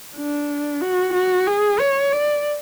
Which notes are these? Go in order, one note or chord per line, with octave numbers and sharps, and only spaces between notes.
D4
F#4
F#4
G#4
C#5
D5